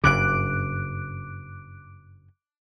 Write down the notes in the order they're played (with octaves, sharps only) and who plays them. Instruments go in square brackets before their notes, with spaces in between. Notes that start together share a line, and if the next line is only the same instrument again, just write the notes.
[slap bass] F#1 G2 C#3 [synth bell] D6 F#6 D7